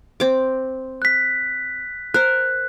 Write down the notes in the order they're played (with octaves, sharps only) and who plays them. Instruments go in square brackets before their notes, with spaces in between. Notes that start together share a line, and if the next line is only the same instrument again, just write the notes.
[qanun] C4 D6
[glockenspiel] F#6 B6
[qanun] A#4 C5 [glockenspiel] F#6